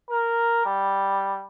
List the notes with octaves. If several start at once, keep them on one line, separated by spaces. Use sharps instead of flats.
A#4
G3